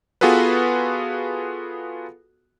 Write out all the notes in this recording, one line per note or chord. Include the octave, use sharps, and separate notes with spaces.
B3 F4 F#4 G#4 A4 B4